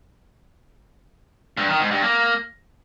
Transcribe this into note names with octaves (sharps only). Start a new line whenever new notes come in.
G2
D#3
G#2
G2
A#3